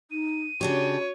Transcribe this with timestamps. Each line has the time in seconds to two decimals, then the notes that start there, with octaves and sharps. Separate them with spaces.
0.11 D#4 D#7
0.61 C#3 D4 F#4 G4 C#5